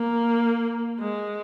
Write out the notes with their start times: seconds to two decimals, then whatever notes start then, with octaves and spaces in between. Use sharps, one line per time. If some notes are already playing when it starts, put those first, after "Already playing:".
Already playing: A#3
1.00 G#3